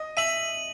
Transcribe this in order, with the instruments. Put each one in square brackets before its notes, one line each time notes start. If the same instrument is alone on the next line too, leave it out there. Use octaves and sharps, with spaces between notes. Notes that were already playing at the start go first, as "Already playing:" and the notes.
Already playing: [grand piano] D#5
[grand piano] E5 [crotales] D#7 F#7